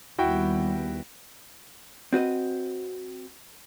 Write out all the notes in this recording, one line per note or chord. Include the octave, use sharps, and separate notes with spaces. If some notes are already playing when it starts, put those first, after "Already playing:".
D#2 G3 B3 E4 F#4 G5
C4 F#4 B4 D#5